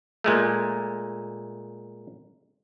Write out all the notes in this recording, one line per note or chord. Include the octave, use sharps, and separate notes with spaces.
A#2 G#3 A3